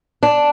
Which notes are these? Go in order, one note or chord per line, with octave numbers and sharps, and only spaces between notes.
D4